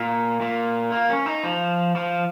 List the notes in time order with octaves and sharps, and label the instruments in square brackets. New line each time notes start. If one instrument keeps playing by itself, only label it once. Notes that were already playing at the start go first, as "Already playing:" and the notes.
Already playing: [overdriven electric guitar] A#2
A#2
A#3
C#4
D#4
F3
F3